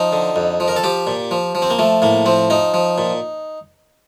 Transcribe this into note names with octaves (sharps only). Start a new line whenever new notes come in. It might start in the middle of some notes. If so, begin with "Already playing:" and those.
Already playing: F3 D#4
D3
F2
F3
A#4
A4
F3 G4
A#2
F3
F3
C4
A#3
F3 A3
A2 A#3
F3 C4
F3 D#4
F3
A#2